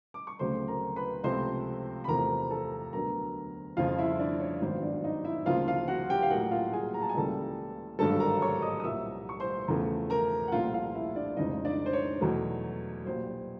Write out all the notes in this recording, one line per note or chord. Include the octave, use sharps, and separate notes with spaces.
D6
C#6
D2 C#3 F#3 A3 C4 C5 C6
A#4 A#5
B4 B5
C#2 C3 F3 A3 C4 C5 C6
B5
E2 C3 F3 A3 A#4 A#5
A4 A5
D2 D3 F#3 B3 A#4 A#5
F2 C#3 F3 F4 F5
E4 E5
D4 D5
C#5
G#1 G2 D#3 F#3 B3 C5
D4 D5
D#4 D#5
E4 E5
D2 C#3 F3 A#3 F4 F5
F4 F5
F#4 F#5
G4 G5
F5
A#1 A2 F#3 A#3 F#4 F#5
F4 F5
G#4 G#5
A#5
A5
G#5
C#2 C#3 E3 G3 A#3 A4 A5
G#1 G2 D3 F#3 A4 A5
A#4 A#5
C#5 C#6
D#5 D#6
D#6
C2 A#2 F3 A#3 E5 E6
C#6
C5 C6
E2 C#3 F3 A3
A#4 A#5
F#5
C2 A#2 F3 A3 F4 F5
F4 F5
E4 E5
D4 D5
F1 F2 C#3 E3 G#3 D#4 D#5
D4 D5
C5
C#5
E2 B2 F#3 A3
B1 A#2 G3 C5